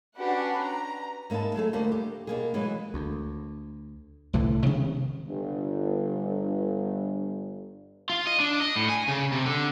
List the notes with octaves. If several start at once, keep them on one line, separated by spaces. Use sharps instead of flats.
C#4 D4 F#4 G4 B4 F#5
A#5
G#2 A#3 D#4 E4 A5
F#3 A3 G#4 A4
D2 G3 A#3 C5
G4
B2 A#3 G#4
E3 F#3 G#3
D2
C2 A2 D3 E3
C3 D#3 G#3 B3
G1 G2
F4
D#5
D4
D#5
A2
G#5
C#3
C3
D3